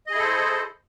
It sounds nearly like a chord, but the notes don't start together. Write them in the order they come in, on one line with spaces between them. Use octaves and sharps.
D#5 G#4 E4 A4 C5